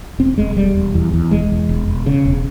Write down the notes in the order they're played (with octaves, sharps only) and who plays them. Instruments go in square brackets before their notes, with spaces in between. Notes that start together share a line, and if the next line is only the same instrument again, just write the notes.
[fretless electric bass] E1 C4
E1 G#3
E1 G3
E1
E2
E2
E1 G#3
E2
E1
E1
C#3
E1